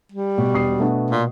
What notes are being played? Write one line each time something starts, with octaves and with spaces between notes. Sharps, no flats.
G3
B2
E1 D#6 C7
A3 B3 D4
A#2